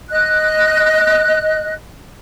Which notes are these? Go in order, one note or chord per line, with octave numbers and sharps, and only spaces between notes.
D#5 F#6